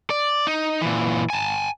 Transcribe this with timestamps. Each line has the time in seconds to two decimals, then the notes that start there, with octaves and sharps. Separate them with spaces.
0.10 D5
0.47 D#4
0.82 A#2 E3
1.30 G#5 A5